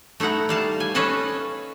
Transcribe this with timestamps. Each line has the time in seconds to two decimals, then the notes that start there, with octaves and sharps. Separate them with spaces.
0.20 A3 D#4 E4 F#5 A#5
0.49 G3 F5 A5
0.80 G#5
0.95 C#4 A4 B4 D#5 F5